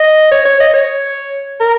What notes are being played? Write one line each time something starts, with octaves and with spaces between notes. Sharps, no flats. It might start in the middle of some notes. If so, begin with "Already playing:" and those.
Already playing: D#5
C#5
C#5
D#5
C#5
A#4